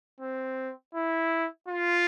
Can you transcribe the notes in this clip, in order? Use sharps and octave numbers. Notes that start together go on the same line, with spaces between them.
C4
E4
F4